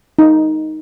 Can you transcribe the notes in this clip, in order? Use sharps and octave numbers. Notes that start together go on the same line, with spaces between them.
D#4